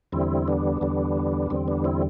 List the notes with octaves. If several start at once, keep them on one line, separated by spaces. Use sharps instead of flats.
E2 D3 G3 C4 E4
B3 D4
E2 D3 G3
E2 D3 G3 C4
B3 D4
C4 E4